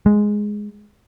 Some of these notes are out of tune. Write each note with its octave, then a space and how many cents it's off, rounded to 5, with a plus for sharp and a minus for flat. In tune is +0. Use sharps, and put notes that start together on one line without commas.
G#3 +0